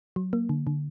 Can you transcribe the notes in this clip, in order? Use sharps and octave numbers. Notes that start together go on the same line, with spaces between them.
F#3
A#3
D3
D3